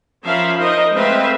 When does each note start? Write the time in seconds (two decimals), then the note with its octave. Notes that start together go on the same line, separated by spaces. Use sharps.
0.23 F3 C#4 A#4 E5 F5 B5
0.57 D#4 A#4 C5 D#5
0.92 G#3 A3 C4 B4 E5 F5